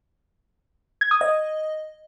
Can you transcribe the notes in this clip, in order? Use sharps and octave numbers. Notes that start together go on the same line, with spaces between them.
G#6
D#6
D#5